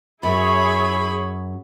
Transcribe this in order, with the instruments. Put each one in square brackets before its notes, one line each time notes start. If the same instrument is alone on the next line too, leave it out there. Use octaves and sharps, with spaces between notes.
[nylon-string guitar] F#2 [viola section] E4 G#4 C#5 [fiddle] B5